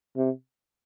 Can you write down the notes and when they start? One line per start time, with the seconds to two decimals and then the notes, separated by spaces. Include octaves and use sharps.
0.16 C3